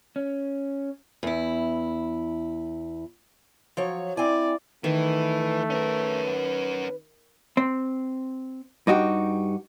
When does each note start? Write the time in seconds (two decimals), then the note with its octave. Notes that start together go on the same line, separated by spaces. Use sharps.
0.16 C#4
1.23 E2 E4
3.77 F3 F#3 C#5
4.17 C4 E4 D5 G#5
4.84 D#3 E3 A3 B4
5.70 C#4 A#4 B4
7.57 C4
8.87 G2 D#4 F#4 G4